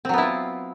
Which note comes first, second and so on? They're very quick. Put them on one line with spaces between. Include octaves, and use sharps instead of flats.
C4 F#3 B3 E4 F4